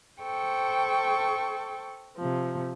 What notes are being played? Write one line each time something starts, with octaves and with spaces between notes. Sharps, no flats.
A4 C5 G5 C#6
C3 F3